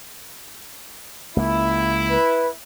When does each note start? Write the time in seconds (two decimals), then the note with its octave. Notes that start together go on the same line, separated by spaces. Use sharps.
1.36 C#2 A#3 E4
2.10 B4